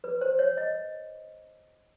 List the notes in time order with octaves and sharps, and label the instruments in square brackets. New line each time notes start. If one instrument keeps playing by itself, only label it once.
[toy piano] B4
C5
C#5
D#5